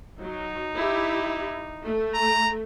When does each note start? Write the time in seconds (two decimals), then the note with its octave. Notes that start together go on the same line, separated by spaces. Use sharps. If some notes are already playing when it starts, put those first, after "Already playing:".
0.19 F#3 D#4
0.76 E4 G4
1.84 A3
2.14 A#5